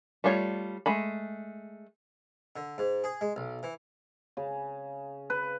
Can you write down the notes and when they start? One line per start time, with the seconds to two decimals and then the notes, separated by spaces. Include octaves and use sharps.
0.24 G3 A3 F4 C#5
0.86 G#3 A3 B5
2.56 D3
2.78 G#2
3.04 G#4
3.21 G#3
3.36 B1
3.63 E3
4.37 C#3
5.30 B4